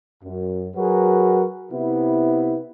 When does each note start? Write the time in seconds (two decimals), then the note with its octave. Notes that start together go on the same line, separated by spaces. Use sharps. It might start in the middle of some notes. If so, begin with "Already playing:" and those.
0.24 F#2
0.76 F#3 F#4 G#4 A#4 B4
1.72 C3 B3 E4